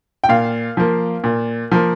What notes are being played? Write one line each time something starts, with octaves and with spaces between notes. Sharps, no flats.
G5
A#2 F5
F3 A#3
A#2
F3 A#3